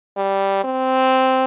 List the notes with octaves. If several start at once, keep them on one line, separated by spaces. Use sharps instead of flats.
G3
C4